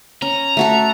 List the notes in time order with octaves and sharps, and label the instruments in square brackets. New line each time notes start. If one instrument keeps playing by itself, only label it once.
[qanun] C#4 [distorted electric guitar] A#5
[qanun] A3 F#4 A4